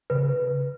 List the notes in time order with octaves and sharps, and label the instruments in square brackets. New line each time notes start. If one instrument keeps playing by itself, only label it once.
[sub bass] C#3 [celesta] B4